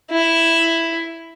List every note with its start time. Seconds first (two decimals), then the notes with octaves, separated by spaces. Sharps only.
0.11 E4